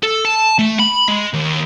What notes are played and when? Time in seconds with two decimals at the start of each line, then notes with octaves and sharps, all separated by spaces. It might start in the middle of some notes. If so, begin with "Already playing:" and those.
0.03 A4
0.25 A5
0.59 A3
0.80 B5
1.08 G#3
1.34 D#2